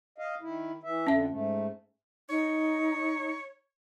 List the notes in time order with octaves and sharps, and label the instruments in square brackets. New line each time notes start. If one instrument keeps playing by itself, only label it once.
[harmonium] D#5 F5
D#3 E4
E3 E5
[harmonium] F2 D3 [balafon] C#4 E5
[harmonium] G#2 A3
[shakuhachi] D#4 [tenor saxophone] C#5